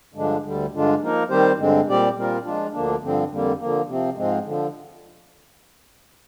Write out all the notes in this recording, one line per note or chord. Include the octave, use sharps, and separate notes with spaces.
G2 D3 F3 G#3 D4
D2 D3 G3
G2 D3 G#3 D4 F4
F3 A#3 D#4 A#4
D#3 G3 C4 G4 C5
G2 D3 G#3 C4
A#2 G3 C4 G4 D5
A#2 G3 C4 F4 A#4
F3 G#3 D4 F4
D2 D3 F3 A#3 D4
G2 D3 F3 C4
F2 D3 G3 A#3
D3 F3 A#3
C3 F3 C4
G#2 F3 G#3 C4
D3 F3